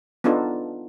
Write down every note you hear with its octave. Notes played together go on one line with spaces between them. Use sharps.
B3 D4 D#4 F4 A4